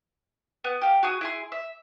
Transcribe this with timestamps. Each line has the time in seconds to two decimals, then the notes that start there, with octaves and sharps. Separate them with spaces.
0.64 B3
0.81 G4 F5
1.03 F#4 G#4 D#6
1.21 E4 G#4 C6
1.52 E5